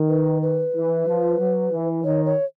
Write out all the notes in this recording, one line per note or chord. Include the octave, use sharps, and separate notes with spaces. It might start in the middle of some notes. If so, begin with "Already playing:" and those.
Already playing: D#3
B4
B4
E3
F3
F#3
E3
D#3 C#5
C#5